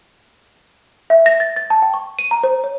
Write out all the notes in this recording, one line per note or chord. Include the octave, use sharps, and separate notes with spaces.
E5
A#6
A6
A6
A5
G5
C#6
D#7
A#5
C5
C#5